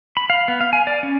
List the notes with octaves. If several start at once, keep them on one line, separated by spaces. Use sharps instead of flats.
B5
F5
B3
F5
G#5
D5
C#4